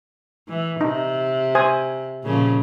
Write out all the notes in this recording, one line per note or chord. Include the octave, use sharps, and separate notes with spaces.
E3
C3 D#4
C5 G#5 D#6
A#2 C#3 F3